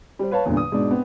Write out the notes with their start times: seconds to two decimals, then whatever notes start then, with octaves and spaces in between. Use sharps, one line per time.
0.19 G3 C5
0.31 B4 C#5 F5 A5
0.46 E2 G2 A#2 D3
0.57 D#6
0.72 G#2 B2 D4
0.91 B3 C4